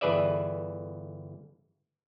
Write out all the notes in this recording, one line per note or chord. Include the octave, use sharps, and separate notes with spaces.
G1 E3 G#4 B4 D5 E5